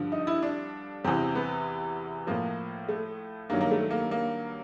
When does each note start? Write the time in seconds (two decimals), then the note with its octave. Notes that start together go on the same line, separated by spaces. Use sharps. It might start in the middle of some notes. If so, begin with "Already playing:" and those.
Already playing: G2 D3 F3
0.12 D#4
0.27 E4
0.42 D4
1.05 E2 C3 E3 C4
1.35 B3
2.27 A2 F3 A#3
2.89 A3
3.50 G2 D#3 F#3 A#3
3.61 A#3
3.71 A3
3.91 A#3
4.11 A#3